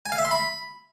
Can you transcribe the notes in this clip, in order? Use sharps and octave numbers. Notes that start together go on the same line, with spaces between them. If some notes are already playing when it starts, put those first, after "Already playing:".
G#5
F5
E5
C6
B5